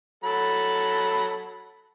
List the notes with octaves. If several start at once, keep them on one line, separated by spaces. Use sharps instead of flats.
F#3 A4 B5